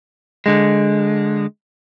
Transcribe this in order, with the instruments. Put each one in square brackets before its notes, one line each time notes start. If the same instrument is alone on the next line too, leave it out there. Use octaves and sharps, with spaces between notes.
[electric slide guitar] D3 G#3